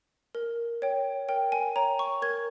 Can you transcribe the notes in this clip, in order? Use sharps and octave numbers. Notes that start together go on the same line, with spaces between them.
A#4
C#5 G5
A#4 G5
G#5
C#5 G5 A#5
C#6
A#4 G#6